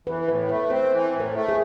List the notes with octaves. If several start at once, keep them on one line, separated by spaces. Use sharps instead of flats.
E3 B4
A2 B4
A3 B4
C4 C5
E3
A2
A#4
A3
G#4